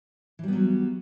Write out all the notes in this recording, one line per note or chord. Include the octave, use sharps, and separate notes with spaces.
E3 F#3 G3 B3